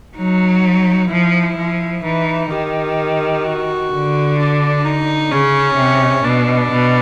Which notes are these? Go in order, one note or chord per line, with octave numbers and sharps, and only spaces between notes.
F#3 D#4
F3 E4
F3
E3 D#4
D#3 G4
F#4
D3
D4
D#4
C#3 C#4
C3
B2 D4
B2